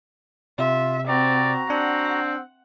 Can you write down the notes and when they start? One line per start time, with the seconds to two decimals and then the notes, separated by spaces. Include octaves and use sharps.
0.59 C3 F4 E5
1.08 C4 F#4 D5 A#5
1.70 C4 D4 F#5